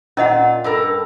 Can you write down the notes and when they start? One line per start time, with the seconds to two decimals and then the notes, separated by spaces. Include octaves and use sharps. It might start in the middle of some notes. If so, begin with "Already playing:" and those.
0.17 A#2 C#4 F4 D#5 F#5
0.64 G2 A4 A#4